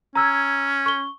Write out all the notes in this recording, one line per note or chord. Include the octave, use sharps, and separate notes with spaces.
C#4 A#5 E6 G#6
C#6 G7